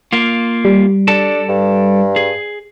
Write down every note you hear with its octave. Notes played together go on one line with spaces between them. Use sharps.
A#3 F4
G3
D4 A4 D5 A5
G2
G#4